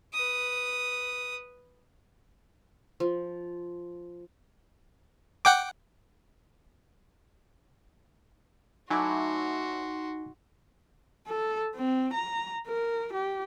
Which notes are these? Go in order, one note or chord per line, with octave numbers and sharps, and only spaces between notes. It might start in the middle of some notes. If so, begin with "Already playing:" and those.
B4 D#6
F3
F#5 G5 D6
F#3 A3 D#4 E4 F#4 G#5 C6 D6
A4
C4
A#5
A#4
G4